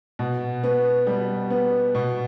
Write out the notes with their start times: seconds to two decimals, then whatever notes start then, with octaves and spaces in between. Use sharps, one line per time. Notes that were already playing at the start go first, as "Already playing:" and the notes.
0.19 B2
0.63 B3
1.07 G3
1.50 B3
1.95 B2